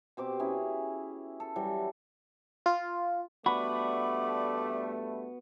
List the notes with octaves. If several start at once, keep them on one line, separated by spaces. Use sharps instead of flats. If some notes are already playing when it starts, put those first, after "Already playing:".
B2 C4 G4 D6
C#4 E4 G#4
A4
E3 F#3 G3
F4
G2 A3 B3 F#4 D5 B5